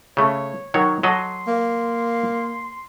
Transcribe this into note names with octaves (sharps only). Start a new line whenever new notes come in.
C#3 A3 C#5
D#3 F#3 C#5
F#3 A4 D#5 C6
A#3